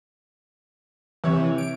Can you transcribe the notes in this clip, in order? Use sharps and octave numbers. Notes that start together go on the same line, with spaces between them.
C3 E3 C#5
D7